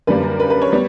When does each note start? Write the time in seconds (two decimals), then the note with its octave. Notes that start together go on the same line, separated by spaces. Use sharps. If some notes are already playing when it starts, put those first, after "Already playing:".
0.07 F#2 D3 G3 A#3 B4
0.24 A#4
0.40 B4
0.50 B4
0.62 C#5
0.72 G3 B3